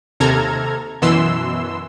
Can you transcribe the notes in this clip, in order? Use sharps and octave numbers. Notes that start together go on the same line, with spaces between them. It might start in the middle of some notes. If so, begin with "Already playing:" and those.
D#2 C3 A4 A#5 F6 G#6
F#2 B2 E3 C6 E6